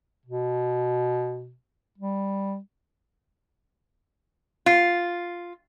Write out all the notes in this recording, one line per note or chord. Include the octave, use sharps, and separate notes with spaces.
B2
G3
F4